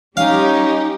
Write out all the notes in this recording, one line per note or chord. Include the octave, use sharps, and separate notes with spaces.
G3 C#4 D#4 G4 F5